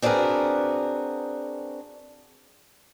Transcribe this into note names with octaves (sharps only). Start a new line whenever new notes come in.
C4 D4 F#4 G#4 A#4 B4